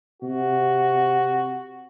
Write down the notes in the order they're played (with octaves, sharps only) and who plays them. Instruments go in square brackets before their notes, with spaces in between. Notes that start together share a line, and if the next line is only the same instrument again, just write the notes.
[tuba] C3 [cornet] F#4